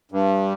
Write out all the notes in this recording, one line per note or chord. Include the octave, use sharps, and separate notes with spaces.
G2